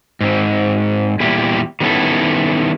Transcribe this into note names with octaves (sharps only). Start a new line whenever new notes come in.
G#2 C4
E2 A#2 G3 E4 G4
D#3 G3 B3 C#4 E4 A4